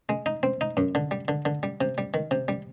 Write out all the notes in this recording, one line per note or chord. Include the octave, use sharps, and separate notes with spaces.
G#3
D#4
C4
D#4
F#2
D3
G3
D3
D3
G3
C3
G3
D#3
C3
G3